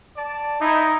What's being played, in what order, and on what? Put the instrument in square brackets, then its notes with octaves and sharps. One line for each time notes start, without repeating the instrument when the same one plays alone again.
[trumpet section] D5 A5
[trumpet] D#4 [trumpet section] E4